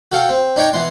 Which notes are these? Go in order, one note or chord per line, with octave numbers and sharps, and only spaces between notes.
F#4 A4 F5 G5
C4
D4 D#4 C#5 G5 A#5
E3 B3 C6